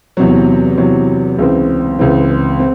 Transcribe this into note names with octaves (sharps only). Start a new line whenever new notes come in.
E2 C3 F#3
E2 C3 F#3
C#2 C#3 E3 C4
C#2 C#3 E3 C4
C4